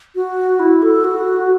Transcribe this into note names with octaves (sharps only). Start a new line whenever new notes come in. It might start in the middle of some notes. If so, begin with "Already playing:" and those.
F#4
E4
A4
F#4